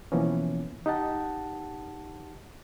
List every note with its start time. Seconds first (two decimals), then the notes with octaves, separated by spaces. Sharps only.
0.12 B2 E3 F3 A#3 B3 C#4
0.86 D#4 G4 D#5 F#5 A5